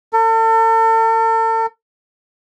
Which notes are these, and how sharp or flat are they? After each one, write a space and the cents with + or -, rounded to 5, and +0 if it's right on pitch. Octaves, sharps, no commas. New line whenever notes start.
A4 +40